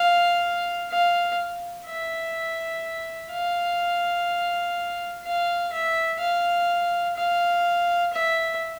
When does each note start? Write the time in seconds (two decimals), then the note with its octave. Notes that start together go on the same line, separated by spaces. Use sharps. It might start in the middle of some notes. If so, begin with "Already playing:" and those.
Already playing: F5
0.91 F5
1.87 E5
3.31 F5
5.24 F5
5.73 E5
6.20 F5
7.17 F5
8.13 E5